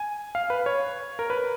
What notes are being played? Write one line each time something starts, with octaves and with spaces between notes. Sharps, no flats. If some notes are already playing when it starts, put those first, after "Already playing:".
Already playing: G#5
F5
B4
C#5
A#4
B4